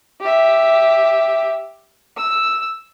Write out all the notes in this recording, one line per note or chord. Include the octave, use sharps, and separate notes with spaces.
G4 E5
E6